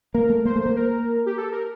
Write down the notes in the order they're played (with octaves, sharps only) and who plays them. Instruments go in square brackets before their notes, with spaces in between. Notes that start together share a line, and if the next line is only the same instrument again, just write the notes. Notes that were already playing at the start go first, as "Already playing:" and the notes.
[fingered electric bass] A#3 [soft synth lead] A#4
[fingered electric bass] A3
[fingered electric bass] A#3 [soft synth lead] C5
[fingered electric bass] A3
[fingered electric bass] A#3 [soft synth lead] C5
[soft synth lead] A#4
G4
A4
A#4